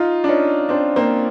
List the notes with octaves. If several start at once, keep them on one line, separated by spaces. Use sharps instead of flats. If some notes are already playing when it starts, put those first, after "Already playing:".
Already playing: D#4 F4
D4
C#4 D#4
C4 D4
A#3 C4